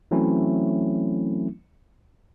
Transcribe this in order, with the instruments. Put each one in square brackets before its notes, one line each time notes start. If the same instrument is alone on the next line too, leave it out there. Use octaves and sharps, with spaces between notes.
[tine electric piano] E3 F#3 A3 C4 C#4 E4